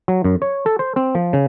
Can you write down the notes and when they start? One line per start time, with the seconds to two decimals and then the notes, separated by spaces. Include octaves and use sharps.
0.08 F#3
0.24 F#2
0.42 C#5
0.66 A4
0.79 C5
0.96 C4
1.15 F3
1.33 C#3